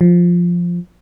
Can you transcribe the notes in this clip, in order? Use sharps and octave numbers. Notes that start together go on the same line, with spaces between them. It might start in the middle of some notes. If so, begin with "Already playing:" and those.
F3